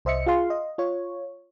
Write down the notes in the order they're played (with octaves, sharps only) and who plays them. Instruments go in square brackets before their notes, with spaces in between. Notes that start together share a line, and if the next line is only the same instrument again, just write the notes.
[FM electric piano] C2 C5 D#5 E5 C#7
F4 G#4 F5 C6
D#5
F4 C#5